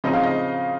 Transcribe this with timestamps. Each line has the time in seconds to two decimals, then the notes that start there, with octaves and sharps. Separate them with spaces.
0.04 C#3 F3 C4 D#4 D#5
0.13 F5
0.23 D#5